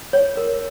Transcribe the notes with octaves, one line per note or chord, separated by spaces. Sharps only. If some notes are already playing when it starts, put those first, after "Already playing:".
C#5
A#4